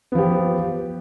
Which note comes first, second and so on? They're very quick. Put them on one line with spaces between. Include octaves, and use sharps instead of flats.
B3 F3 G4